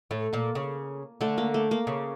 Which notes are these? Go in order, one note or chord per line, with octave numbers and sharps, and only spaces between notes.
A2 A3
A#2 A#3
C#3
D3 A3
A#3
A3
A#3
C#3